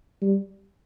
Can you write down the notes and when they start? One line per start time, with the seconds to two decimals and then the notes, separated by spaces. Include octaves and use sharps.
0.22 G3